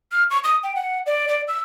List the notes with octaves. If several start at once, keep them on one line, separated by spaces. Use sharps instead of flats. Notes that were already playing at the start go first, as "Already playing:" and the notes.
F6
C#6
D#6
G5
F#5
D5
D5
E6